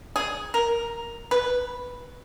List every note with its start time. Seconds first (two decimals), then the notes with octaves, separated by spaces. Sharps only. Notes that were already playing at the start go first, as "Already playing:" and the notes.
0.16 G#4
0.54 A#4
1.31 B4